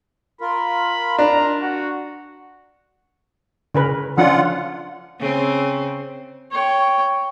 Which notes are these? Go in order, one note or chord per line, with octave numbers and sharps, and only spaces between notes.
F4 A#4 B5
D4 A#5
F#4
C#3 A#4 B4
F3 C#4 D4 F4 F#5
C#3 C4
C#5 G5